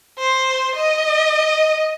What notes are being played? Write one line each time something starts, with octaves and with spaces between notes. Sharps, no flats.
C5
D#5